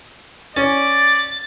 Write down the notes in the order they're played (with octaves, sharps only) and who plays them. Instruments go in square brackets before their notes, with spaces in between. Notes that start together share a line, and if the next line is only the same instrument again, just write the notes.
[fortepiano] C#4 [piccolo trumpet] D5 [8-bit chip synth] A6